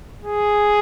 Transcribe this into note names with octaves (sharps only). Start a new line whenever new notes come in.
G#4